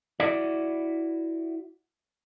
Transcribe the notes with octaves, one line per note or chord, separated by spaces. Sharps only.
E4 F#4 D5